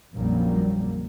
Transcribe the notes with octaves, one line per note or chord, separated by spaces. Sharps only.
A#1 F2 C#3 F#3 G3 A#3